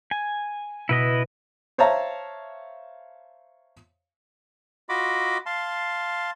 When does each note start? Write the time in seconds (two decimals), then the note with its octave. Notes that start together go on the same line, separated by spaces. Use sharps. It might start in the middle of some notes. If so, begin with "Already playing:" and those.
0.11 G#5
0.89 B2 E4 B4 D#5
1.78 C5 C#5 E5 F5 A5 A#5
4.89 F4 F#4 D#5 B5 D6
5.46 F5 A5 C6